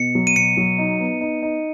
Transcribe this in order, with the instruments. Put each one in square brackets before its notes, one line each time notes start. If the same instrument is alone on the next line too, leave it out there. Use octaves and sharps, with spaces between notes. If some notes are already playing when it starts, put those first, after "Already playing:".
Already playing: [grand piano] B2 [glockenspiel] C#7
[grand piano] F#3
[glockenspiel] D#7
[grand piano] B2 [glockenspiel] C#7
[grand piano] F#3
D#4
B3
D#4
D#4